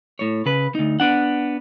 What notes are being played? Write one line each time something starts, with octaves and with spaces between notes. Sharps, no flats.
A2 C#5
C#3 B4
D2 D#4
B3 D4 F#5